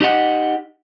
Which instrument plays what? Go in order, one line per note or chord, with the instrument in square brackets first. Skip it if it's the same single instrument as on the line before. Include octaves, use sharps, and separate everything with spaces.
[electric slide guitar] D#4 G4 D#5 F#5